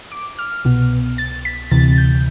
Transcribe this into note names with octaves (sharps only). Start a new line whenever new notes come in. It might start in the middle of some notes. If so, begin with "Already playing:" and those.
D6
F6
C2 B2 B3
A6
B6
D2 C3 E3 A6
G6